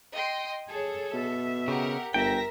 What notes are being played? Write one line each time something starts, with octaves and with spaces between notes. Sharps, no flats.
D#5 G5 C6
G#4 A4 C#5
B2 E5
C#3 G4 A#4 F#5
G1 A#4 E5 G5 A#6 B6